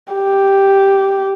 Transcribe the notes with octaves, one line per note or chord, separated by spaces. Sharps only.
G4